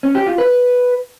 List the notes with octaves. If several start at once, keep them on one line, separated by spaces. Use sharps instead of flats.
C#4
G4
F4
B4